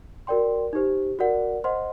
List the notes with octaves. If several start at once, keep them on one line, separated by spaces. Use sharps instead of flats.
F#4 A#4 D5 G5 C6
D#4 G4 C5
F#4 A#4 D5 F#5
C5 D#5 F#5 C6